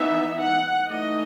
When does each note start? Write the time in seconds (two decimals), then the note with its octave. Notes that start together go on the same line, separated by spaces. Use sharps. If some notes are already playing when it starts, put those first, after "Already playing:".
Already playing: E3 B3 D#4 E5
0.42 F#5
0.91 E3 A3 D#4 D#5